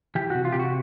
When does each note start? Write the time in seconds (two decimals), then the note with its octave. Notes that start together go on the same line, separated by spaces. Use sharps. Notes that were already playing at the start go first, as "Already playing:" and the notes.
0.15 E3 G4
0.30 C3 F#4
0.45 F4
0.52 C3 G4
0.59 F#4